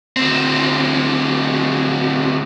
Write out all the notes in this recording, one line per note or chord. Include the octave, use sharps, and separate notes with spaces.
D2 C4